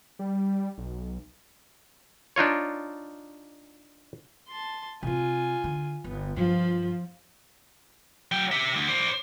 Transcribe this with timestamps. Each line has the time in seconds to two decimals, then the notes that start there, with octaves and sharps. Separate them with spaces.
0.19 G3
0.78 B1
2.36 D4 D#4 F4 C#5
4.48 A5 C6
5.03 C3 C4 F4 G#5
5.64 D3
6.04 G1 B3
6.36 G2 F3 F4
8.32 F#3 G5
8.52 G4 E5
8.76 D2
8.88 C5 D5